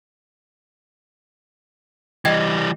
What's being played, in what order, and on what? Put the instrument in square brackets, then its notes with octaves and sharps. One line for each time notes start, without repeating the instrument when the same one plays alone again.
[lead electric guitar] E3 G3 [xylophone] D#5 G5 G#6